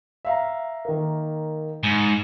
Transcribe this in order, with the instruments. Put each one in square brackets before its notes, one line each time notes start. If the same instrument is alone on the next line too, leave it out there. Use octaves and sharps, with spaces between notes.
[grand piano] E5 F5 A#5
D#3 A#3
[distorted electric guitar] G#2 [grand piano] B5 C#7